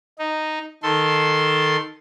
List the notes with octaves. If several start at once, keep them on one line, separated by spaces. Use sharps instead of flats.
D#4
D#3 A4 C6